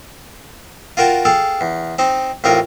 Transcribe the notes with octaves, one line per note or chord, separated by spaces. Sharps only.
F4 F#4 A#4 G5 A5
G#4 A4 F5 G5
E2
C4 D#4 C5
A1 C4 D#4 F4 A#4